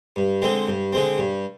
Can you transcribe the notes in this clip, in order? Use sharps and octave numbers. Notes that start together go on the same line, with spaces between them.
G2
D3 G#3 C4
G2
D3 G#3 C4
G2